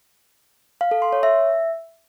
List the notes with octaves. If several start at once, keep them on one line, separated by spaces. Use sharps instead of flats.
F5
A4
C6
C#5
E5